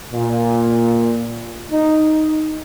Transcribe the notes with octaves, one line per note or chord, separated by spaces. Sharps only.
A#2
D#4